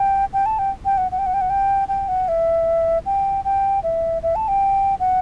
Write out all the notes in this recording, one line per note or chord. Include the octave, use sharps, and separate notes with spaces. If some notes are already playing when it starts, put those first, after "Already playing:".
Already playing: G5
G5
A5
G5
G5
F#5
F#5
G5
F#5
G5
F#5
G5
G5
F#5
E5
G5
G5
E5
E5
A5
G5
F#5